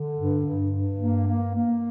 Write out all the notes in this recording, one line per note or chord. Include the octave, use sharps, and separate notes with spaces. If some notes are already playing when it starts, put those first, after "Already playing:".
Already playing: D3
G2
G2
G2
A#3
A#3
A#3